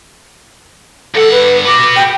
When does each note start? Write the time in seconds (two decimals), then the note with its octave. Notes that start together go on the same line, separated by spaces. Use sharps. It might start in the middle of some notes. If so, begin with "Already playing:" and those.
1.15 G2 A4 F#5
1.31 B4
1.65 F#4 B4 D6
1.96 G5